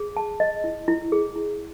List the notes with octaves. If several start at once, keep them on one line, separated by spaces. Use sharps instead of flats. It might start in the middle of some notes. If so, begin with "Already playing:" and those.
Already playing: G#4
A5
D#5
E4
E4
G#4
E4